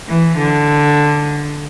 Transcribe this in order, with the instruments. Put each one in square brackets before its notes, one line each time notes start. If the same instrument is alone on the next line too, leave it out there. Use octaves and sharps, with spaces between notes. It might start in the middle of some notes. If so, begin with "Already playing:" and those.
[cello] E3
D3